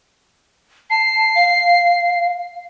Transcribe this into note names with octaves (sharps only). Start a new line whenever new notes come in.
A5 C7
F5